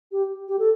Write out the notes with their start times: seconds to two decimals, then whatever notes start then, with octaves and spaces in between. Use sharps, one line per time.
0.12 G4
0.48 G4
0.59 A4